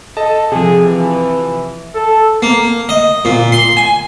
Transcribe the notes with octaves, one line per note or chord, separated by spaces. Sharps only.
A4 D#5 A5
C3 F3 G#4
E3
A4
A#3
D#5
A#2
C6
G#5